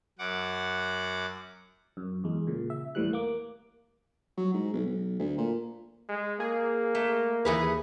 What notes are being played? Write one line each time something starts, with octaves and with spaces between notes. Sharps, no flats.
F#2 F#5 D6
F#2
E2 G#3
A#2 C#3
E5
A1 D#2 A2 E3 G3 F#6
A#3 D6
F#3
G#2
B1
B1
D2
A#2
G#3
A#3 G#4
A3
D#2 E3 G#4 B4